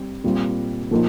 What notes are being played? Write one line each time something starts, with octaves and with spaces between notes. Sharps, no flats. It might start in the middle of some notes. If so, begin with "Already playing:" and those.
Already playing: G3 C4
A#2 G3 C4 F4
A#2 F3 A#3 D#4